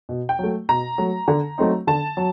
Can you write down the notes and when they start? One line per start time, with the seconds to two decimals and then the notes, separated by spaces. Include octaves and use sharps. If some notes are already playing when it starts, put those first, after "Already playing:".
0.09 B2
0.29 G5
0.39 F#3 A3
0.69 B2 A#5
0.98 F#3 A3
1.28 D3
1.58 F#3 A3 C4 D#4
1.87 D3 A5
2.17 F#3